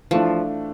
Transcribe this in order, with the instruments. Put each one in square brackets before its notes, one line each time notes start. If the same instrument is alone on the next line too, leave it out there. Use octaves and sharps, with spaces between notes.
[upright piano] E3 A3 D4 [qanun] F3